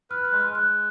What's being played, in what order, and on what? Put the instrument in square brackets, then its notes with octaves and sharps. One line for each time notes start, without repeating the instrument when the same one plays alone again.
[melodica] B4 [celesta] F6
[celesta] F#6
[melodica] G#3
[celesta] F6
[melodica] G#3 [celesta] F#6